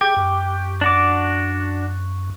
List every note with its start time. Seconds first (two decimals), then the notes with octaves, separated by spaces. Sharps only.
0.01 G4 G#4
0.17 F#2
0.81 D4 F#4 D6